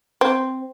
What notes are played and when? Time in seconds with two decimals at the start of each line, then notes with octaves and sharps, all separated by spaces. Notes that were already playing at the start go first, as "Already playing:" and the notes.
0.21 C4